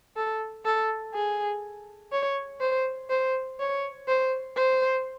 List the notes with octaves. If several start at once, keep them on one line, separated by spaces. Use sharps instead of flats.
A4
A4
G#4
C#5
C5
C5
C#5
C5
C5